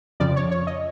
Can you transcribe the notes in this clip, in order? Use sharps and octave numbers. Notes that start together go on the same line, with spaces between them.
F2 C#3 F3 D5
C#5
C#5
D#5